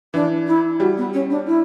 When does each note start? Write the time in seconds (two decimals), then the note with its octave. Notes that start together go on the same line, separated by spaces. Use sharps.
0.14 E3 D4
0.47 E4
0.80 G3 F#4
0.97 B3
1.13 C#4
1.30 D4
1.46 E4